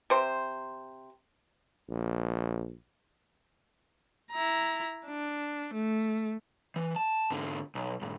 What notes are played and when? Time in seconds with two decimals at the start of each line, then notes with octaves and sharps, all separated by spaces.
0.10 C3 C5
1.89 A#1
4.32 E4 A#5
5.07 D4
5.74 A3
6.76 E3
6.96 A5
7.30 G#2 D3
7.75 B1
8.02 B1 G#2